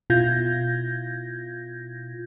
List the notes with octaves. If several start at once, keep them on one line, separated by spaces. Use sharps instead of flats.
B2 E4 F4 G6 G#6 A#6